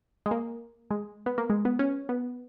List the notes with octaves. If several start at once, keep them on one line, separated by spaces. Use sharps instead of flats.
G#3
A#3
G#3
B3
A#3
G#3
B3
C#4
B3